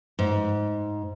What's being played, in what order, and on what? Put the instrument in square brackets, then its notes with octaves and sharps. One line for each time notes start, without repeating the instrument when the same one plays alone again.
[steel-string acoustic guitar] G#2